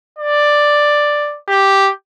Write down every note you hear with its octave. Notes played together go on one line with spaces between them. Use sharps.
D5
G4